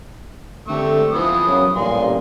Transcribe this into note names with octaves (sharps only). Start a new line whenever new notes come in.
D3 A3 C4 G4 C#6 E6
E3 F3 B3 D#6
F#2 C#3 F#3
A1 G2 A#2 G#5 C6